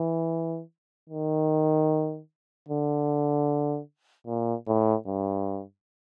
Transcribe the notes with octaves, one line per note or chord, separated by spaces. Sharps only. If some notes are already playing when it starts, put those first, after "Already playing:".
Already playing: E3
D#3
D3
A#2
A2
G2